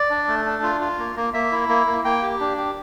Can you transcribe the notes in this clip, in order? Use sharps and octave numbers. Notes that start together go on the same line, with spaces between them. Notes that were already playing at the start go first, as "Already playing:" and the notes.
Already playing: D5
D4
A3
D4
F4
F4
A#3
A#3
A#3 E5
E4
A#3
A#3
A#3 G5
G4
D4
G4